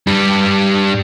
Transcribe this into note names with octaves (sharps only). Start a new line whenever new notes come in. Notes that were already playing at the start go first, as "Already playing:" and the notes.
G2 G3